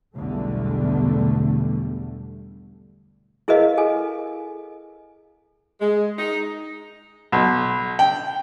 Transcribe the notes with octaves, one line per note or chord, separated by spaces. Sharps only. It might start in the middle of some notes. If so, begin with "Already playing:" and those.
B1 E2 D3 G3 A3
E4 G#4 A#4 B4 D#5 F5
G#4 A4 G#5
G#3
D#4
B1
G5